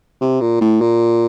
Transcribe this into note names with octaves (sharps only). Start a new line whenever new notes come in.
C3
A#2
A2
A#2